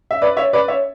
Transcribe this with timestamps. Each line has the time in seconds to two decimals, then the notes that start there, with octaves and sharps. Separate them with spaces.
0.11 E5
0.22 B4 D5
0.37 C#5 E5
0.53 B4 D5
0.68 C#5 E5